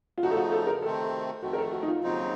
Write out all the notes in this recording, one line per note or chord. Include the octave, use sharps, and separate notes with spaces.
F4
C#3 F3 A3 D#4 F#4
A4
F#4
A4
A#4
C3 D#3 A3 C4 A4
F2 D#3 A3 F#4
A#4
A4
F#4
D#4
F4
D#2 C#3 F#3 C4 D#4